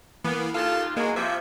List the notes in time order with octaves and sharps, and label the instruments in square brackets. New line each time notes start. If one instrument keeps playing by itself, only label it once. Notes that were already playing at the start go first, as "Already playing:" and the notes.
[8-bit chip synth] E3 A#3 [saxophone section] B3
[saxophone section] D#2 F4 [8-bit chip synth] A4 A5
[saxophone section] E3 F#3 G#3 [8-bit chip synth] A#3
[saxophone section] C3 F3 [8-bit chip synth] E5